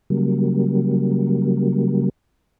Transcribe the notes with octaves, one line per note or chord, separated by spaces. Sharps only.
C#3 F#3 G3 A#3